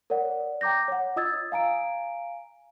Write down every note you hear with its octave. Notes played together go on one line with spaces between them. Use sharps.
A#4 C#5 D5 F#5
G5 A#5 D6 G6 A#6
C#5 F#5
F4 D#5 D#6 E6 G#6 A6
F5 G#5 A#5 D7